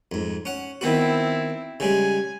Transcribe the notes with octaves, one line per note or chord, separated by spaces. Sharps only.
F2 G#2
C#4 F#5
D#3 B3 C4 E4 F#4
C#3 G3 G#3 G#5